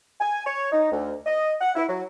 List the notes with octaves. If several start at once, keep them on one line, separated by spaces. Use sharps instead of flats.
G#5
C#5
D#4
D2
D#5
F#5
E4
F#3